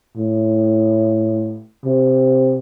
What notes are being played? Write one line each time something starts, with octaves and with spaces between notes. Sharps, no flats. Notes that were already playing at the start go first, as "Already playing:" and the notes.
A2
C3